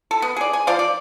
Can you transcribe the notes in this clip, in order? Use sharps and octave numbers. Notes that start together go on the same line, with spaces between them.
A4
B3
G#4 D5
G#5
F3 D5 F5
D5